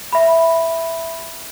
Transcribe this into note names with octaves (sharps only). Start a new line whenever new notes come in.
E5 B5